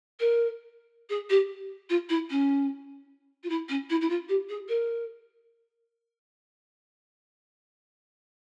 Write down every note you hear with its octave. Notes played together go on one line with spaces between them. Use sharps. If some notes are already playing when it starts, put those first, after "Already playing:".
A#4
G#4
G4
F4
E4
C#4
F4
E4
C#4
E4
E4
F4
G4
G#4
A#4